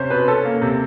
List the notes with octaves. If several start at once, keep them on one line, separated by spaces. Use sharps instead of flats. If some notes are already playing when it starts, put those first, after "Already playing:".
Already playing: C3 C#4 C5
B2 B4
C#4 A4
A#3
C3